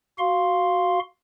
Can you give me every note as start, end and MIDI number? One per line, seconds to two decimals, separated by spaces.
0.19 0.99 66
0.19 0.99 77
0.19 0.99 84